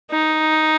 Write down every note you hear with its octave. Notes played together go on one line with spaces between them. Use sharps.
D#4